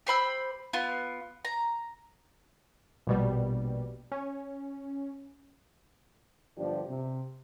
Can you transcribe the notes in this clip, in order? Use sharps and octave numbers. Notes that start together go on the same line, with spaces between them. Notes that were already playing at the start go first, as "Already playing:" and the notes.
G4 C5 B5 E6
B3 F4
A#5
A#1 B2 G3
C#4
G1 F3 D4 G4
C3